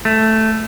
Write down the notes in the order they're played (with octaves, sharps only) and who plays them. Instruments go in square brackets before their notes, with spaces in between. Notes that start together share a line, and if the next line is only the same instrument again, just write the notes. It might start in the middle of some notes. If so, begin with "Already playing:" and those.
[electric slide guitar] A3